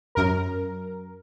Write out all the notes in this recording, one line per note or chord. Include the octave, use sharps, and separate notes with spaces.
F#2 A#4